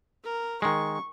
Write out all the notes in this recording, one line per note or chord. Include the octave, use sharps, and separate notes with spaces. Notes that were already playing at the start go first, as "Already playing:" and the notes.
A#4
D#3 G#3 C#6